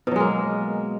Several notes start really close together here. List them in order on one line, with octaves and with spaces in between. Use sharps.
B2 F#3 G#3 A#3